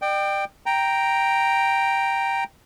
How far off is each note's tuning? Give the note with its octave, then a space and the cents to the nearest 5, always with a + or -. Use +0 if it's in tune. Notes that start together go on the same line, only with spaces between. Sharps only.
D5 +45 G5 +0
G5 +0 A#5 +0